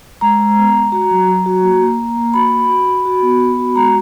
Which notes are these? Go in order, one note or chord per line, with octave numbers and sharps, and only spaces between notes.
G#3 A#5
G#3
B3
G#3
F#4 A#5
F#3
F#3
F#4
A#3
A#3
A#3
A#3
F#4 B5
F#4
F#4
F#4
F#4
B3
B3
F#4
G#3 A#5